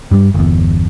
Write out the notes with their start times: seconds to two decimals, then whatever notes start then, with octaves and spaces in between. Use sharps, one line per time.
0.11 G2 G3
0.34 G1 E2